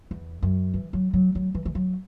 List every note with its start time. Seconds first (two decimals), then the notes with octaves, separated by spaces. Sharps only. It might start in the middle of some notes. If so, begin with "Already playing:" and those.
0.11 E2
0.42 F#2
0.74 E3
0.93 F#3
1.13 F#3
1.35 F#3
1.55 E3
1.65 E3
1.75 F#3